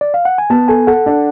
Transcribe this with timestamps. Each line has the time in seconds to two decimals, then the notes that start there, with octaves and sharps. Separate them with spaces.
0.01 D5
0.14 F5
0.25 F#5
0.38 G#5
0.50 B3 A5
0.68 A4 G#5
0.87 A4 F#5
1.06 D4